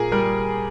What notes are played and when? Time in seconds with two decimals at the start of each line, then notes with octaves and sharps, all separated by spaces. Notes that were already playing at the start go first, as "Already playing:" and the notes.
Already playing: A#2 G#4 A#4
0.12 G3 A#4